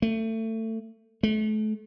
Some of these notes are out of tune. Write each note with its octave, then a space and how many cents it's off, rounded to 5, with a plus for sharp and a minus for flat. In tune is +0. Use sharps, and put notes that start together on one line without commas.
A3 +25
A3 -35